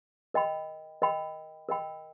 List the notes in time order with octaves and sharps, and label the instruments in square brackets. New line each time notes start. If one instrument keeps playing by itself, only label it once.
[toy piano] A#4 D#5 G5 B5
A#4 D#5 G5 B5
A#4 D#5 G5 B5